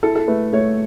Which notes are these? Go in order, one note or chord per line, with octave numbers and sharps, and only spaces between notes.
E4 A4
A4
A3 B4
A3 C#5